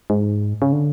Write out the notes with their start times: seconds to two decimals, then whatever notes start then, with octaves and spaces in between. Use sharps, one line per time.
0.10 G#2
0.62 C#3
0.73 D3